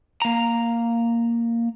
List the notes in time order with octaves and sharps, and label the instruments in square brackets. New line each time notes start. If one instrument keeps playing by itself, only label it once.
[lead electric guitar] A#3 A#5